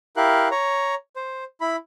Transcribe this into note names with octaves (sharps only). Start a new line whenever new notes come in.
E4 G4 A#4 F5 F#6
C#5 A#5
C5
E4 B5